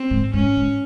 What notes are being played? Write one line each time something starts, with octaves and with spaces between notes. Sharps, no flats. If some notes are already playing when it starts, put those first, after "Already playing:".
Already playing: C4
G#2
G#2 C#4
G#2